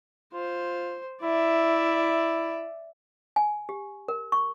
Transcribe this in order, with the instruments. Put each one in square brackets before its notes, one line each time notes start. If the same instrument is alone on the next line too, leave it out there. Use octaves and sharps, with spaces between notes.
[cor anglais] F4 [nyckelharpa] C5
[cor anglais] E4 [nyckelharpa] D5 E5
[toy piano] G#5
G4
A#4
C#6